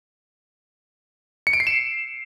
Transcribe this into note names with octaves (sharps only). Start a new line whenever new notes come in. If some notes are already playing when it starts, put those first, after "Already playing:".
C#7
D7
C7
E7